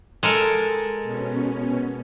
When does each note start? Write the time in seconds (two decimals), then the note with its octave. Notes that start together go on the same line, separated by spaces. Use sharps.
0.23 G#3 A4 A#4
1.03 B2 C#4